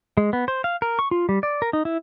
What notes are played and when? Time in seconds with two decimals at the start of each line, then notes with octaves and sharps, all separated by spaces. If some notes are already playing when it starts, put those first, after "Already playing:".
0.17 G#3
0.33 B3
0.48 C5
0.64 F5
0.82 A#4
0.99 C#6
1.11 F4
1.29 G3
1.43 D5
1.62 A#4
1.73 D#4
1.85 E4